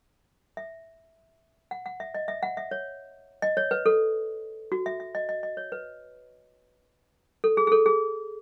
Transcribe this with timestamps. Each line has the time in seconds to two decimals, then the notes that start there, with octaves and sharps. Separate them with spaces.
0.57 E5
1.71 F#5
1.86 F#5
2.00 E5
2.15 D#5
2.28 E5
2.43 F#5
2.57 E5
2.71 C#5
3.42 D#5
3.57 C#5
3.71 B4
3.86 A4
4.72 F#4
4.86 E5
5.00 E5
5.15 D#5
5.29 D#5
5.43 D#5
5.57 C#5
5.72 B4
7.44 A4
7.57 G#4
7.67 G#4
7.72 A4
7.86 G#4